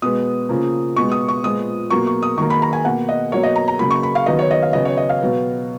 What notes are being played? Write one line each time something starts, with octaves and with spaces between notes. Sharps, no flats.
B2 G#3 B3 D#6
C#3 F3 A#3
B2 G#3 B3 C#6
D#6
C#6
A#2 F3 G#3 B3 D#6
B2 F#3 A#3 C#6
C#6
D#6
D#3 F#3 A#3 C#6
B5
A#5
G#5
B2 A#3 F#5
D#5
B2 F#3 A#3 C#5
D#5
A#5
A#5
C#3 F#3 A#3 B5
C#6
B5
F5
D#3 F#3 B3 D#5
C#5
D#5
F5
C#3 F#3 B3 D#5
C#5
D#5
F5
B2 F#3 B3